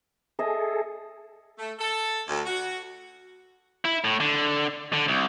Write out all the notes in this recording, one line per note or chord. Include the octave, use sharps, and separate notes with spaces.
G#4 A4 D#5 E5
A3
A4
D2
F#4
E4
A2
D3
D3
C2